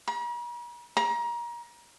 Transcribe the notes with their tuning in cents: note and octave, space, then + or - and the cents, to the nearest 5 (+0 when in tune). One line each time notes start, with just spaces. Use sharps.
A#5 +45
A#5 +30